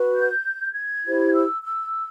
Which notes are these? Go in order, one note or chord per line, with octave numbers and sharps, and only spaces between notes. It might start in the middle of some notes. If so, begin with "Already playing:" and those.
Already playing: F#4 B4
G6
G#6
E4 G4 C5
E6
E6